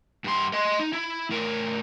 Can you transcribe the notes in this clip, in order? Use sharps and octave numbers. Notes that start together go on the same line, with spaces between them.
G2 C6
D#5 C6
D#4
E4
A2 A#4